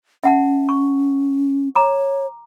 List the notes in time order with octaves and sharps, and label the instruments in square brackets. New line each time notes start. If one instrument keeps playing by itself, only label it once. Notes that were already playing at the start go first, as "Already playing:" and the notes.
[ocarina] C#4 [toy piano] E5 F#5 A5
[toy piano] C#6
[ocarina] C#5 [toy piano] A#5 D6